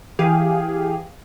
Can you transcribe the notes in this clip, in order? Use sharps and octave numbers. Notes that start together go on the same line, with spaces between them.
E3 G4 G#4 F5